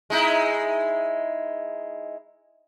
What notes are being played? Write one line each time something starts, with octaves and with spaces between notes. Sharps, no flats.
G#3 D#4 E4